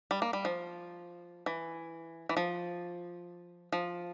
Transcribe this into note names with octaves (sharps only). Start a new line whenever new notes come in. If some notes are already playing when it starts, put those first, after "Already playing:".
G3
A#3
G3
F3
E3
E3
F3
F3